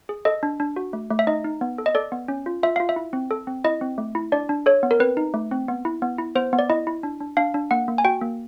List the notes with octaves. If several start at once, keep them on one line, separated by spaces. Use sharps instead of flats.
G#4
A4 D#5
D4
D4
F#4
A3
A3
E5
D#4 D#5
D#4
B3
A4
D#5
A4 D5
B3
C#4
F4
F4 E5
F4 F5
E5
E4
C4
A4
C4
E4 D#5
C4
A3
E4
D4 D5
D4
A4 C#5
B3
A#4
C4 B4
D#4
A3
C4
B3
E4
B3
E4
B3 C5
B3
D5
E4 D#5
E4
D4
D4
D4 F5
D4
A#3 F#5
A#3
G#5
F#4 G5
A#3